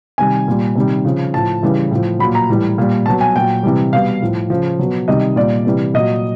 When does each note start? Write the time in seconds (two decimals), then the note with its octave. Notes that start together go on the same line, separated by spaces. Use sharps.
0.18 C3 D#3 G3 G#5
0.48 A#2 G3
0.75 C3 D#3 G3
1.05 C#3 F3
1.34 A2 F3 A5
1.63 C#3 E3 G3
1.91 A2 F3
2.19 F#3 B5
2.24 A#2
2.35 A#5
2.49 A2 E3 G3
2.78 A#2 G3
3.06 B2 F#3 A5
3.21 G#5
3.35 A#2 F#3 G5
3.63 C3 E3 G3
3.92 B2 G3 F5
4.22 A2 F3
4.50 C#3 F3
4.79 B2 F#3
5.08 C3 D#3 G3 D#5
5.36 A#2 G3 D5
5.65 C3 E3 G3
5.94 A#2 F#3 D#5